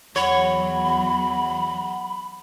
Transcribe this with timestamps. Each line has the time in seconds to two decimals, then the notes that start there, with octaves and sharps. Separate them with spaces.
0.16 E2 F#3 C#5 F#5 B5